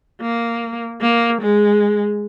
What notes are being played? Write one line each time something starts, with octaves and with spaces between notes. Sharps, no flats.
A#3
A#3
G#3